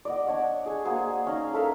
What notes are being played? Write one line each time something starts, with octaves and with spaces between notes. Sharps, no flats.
D5 D#5 F#5
D4 C#5 F#5
G#4 G#5
A#3 F#4 G#4 C5
C#4 D#4 F5 A#5
A4 A#4 E5 F5